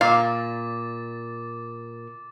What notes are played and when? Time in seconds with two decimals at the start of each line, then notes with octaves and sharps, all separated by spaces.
0.01 A#2 F5 D6 A6